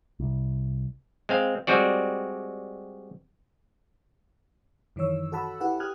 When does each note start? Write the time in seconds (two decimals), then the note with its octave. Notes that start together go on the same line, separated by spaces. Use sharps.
0.20 C2
1.29 G#3 C4 F5
1.67 G3 G#3 C4 F#4 D5
4.96 F#2 D#3 E3 C#5 E6
5.32 F#4 A4 F#5 A5 B5 E6
5.60 E4 G4 B4 F#5
5.80 G4 D#6 F6 F#6 G#6